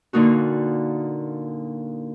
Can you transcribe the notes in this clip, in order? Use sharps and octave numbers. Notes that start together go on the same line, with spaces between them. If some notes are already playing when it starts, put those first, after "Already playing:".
A#2 D3 A#3 D#4 F#4